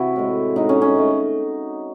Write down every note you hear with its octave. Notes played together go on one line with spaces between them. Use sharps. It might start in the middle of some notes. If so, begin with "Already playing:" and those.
Already playing: C3 E3 E4 F#4
A2 G#3
A2 G#3 D#4
C#4
C#4
D#3 A3